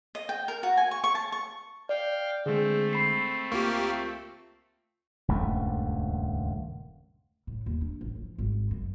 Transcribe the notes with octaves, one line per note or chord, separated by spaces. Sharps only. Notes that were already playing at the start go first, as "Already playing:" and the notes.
D#5
G5
A#4
F#4
G#5
C#6
C#6
A5
C#6
D5 F5 G5
D3 G#3 A3 C4 G#4
B5 C7
C#2 A#3 F4 G4 C#6
D#1 C#2 G2 A3
A2
D#2
D4
A1
F3
G#1
F#2